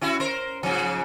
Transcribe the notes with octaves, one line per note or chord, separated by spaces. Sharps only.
C#4 E4 F#4
A#4 C5
G#2 C#3 F3